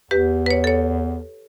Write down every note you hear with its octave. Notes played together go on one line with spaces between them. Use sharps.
E2 G4 B4
B4 C#5
A4 C#5